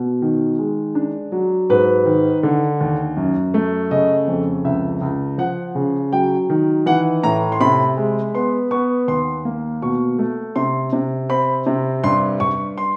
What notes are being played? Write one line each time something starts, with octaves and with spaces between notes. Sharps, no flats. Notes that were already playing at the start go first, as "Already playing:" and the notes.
Already playing: B2
D#3
G#3
D4
F#3
G#2 B4
D#3
D3
D#2
F#2
A3
C#3 D#5
F2
C#2 E5
C#2
F3 F#5
C#3
F#3 G5
D#3
E3 F#5
A2 A#5
C6
C3 B5
G#3
B3 C6
B3 C#6
D#2 C6
A#3
B2 C#6
A3
C3 C6
C3
C4 B5
C3
G2 C6
G2 C#6
C6